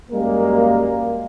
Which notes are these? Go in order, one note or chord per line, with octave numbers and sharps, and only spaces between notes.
F#2 G3 G#3 A#3